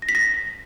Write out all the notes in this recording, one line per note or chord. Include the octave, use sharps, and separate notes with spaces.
A#6
B6
A#6